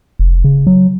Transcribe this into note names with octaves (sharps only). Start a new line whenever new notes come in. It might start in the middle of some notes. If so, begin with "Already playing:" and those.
F1
C#3
F#3